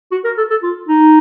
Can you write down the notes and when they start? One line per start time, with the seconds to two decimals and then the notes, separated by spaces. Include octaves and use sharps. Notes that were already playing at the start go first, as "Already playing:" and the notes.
0.12 F#4
0.24 A#4
0.37 A4
0.50 A4
0.63 F4
0.88 D#4